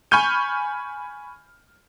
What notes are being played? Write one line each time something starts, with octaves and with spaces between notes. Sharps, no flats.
G#5 B5 C#6 F6 G6 D#7